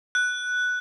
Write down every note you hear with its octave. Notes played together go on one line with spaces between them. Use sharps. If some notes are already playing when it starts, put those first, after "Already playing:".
F#6